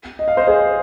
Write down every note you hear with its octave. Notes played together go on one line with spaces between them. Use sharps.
D#5
F5
C5 D#5
G#4 C5